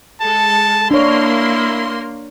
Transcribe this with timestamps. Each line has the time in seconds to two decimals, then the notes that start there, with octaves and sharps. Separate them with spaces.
0.22 G#3 A4 A5
0.91 A#3 D4 E4 C#5 C6